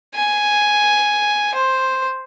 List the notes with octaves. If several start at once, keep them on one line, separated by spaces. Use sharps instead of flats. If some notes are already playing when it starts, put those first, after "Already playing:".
G#5
C5